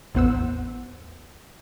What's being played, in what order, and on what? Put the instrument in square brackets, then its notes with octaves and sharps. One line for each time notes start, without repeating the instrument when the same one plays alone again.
[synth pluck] A1 E2 B3 C5 F#5 E6